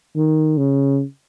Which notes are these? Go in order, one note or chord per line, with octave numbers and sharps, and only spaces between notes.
D#3
C#3